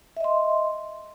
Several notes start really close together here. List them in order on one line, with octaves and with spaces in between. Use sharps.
E5 D#5 C6